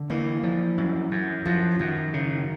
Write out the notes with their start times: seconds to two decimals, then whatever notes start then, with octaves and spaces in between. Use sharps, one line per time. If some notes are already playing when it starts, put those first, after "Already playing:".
Already playing: D3
0.10 E3 A#3
0.43 F3
0.78 F#2
1.11 F#2
1.46 F#2 F3
1.79 F#2 D#3
2.13 C#3